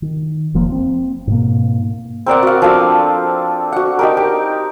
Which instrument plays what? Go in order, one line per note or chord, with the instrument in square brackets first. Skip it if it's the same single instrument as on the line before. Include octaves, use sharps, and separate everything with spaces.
[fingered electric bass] D#3
F1 F3 A#3
C4
G#2 B2 A#3
[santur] C4 A#4 D5 F#5
F#4 F5
F3 D4 A4 F5
F#4 F#5
D#4 G4 A#4
G4